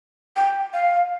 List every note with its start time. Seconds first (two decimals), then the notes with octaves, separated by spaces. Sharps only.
0.36 G5
0.73 F5